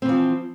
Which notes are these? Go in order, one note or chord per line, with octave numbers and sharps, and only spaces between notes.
E3 F3 C4